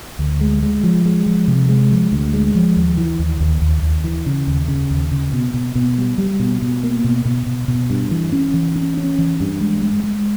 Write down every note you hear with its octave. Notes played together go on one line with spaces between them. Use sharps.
D2
G#3
G#3
F3
G#3
F3
C3
G#3
F3
D2
G#3
F3
D#2
E3
D#2
D#2
D#2
D#2
E3
C#3
D#2
C#3
D#2
C#3
B2
B2
B2
G3
G3
B2
B2
A#3
B2
B2
B2
B2
G2
E3
C#4
E3
C#4
C#4
E3
G2
G#3
G#3
G#3